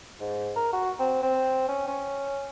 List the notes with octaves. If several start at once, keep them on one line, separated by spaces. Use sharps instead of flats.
G#2
A#4
F#4
C4
C4
C#4
C#4